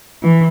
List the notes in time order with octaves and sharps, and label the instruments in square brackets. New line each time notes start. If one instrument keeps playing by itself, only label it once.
[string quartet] E3